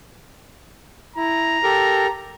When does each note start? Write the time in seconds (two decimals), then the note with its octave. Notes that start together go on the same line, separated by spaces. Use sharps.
1.16 E4 A#5
1.63 G4 A4 A#4